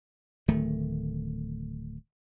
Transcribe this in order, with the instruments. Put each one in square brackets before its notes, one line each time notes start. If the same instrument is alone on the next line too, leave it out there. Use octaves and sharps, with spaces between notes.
[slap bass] D1 D#3 A3